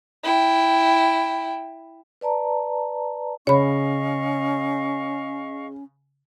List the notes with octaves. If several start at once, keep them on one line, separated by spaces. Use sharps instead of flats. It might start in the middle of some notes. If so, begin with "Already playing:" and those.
E4 G5
B4 D5 A5 A#5
C#3 C#4 C#5 D#5 F5 B5 C#6